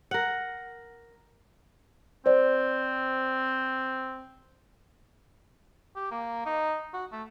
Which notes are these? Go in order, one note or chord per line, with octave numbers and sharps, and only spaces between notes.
A#4 F#5
C4 C5 D5
G4
A#3
D#4
F#4
A3